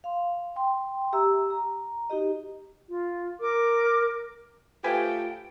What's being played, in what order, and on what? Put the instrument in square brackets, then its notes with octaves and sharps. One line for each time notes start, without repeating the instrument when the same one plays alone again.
[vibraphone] F5 C6
G5 C6
G4 E5 A#5 E6
A#5
D#4 F#4 G4 D#5
[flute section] F4
A#4 D6
[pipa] F3 B4 G#5 [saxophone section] A3 G4 [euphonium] F4 [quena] G5